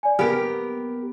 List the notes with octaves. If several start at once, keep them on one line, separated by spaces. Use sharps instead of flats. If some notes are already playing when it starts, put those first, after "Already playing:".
D5 G#5
B3 G4 A#4 G5 F6